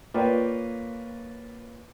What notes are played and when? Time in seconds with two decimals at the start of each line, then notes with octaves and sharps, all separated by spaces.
0.14 A#3 F4 B4 C#5 D5 G5